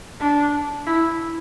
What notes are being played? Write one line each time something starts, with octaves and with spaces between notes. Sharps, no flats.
D4
E4